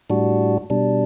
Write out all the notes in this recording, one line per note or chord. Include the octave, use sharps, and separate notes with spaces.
A2 G3 D4 F#4
B2 G3 D4